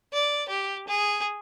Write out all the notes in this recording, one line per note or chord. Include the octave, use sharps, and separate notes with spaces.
D5
G4
G#4